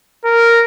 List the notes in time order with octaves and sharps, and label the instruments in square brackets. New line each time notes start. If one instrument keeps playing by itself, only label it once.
[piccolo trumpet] A#4